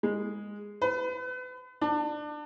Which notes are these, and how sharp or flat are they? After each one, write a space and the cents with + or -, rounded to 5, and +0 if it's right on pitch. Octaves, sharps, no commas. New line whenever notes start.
G#3 -10
B4 +35
D4 +25